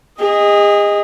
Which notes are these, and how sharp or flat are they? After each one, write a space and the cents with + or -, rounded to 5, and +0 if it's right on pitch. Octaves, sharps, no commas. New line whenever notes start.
G#4 -35 D#5 +0